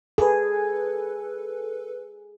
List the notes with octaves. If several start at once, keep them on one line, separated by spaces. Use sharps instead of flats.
G#4 A4 B4